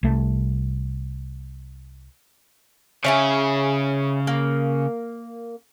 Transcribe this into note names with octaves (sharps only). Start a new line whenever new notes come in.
C2 A3
C#3 C#4 E4 G#4
A#3